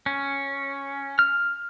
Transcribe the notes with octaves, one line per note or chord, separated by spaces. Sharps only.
C#4
F6